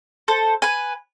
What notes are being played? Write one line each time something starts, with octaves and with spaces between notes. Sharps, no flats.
A4 C5
B4 G#5